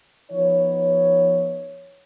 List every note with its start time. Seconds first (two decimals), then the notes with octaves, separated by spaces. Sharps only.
0.31 F3 B3 D#4 C#5